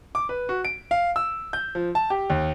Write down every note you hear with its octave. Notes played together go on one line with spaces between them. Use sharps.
D6
B4
F#4
D7
F5
E6
G6
F3
A5
G4
D#2